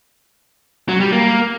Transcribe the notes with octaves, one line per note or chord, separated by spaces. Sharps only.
F#3
G3
A#3